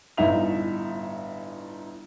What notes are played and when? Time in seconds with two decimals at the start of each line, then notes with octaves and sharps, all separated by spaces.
0.18 G1 A2 D#4 E5 F7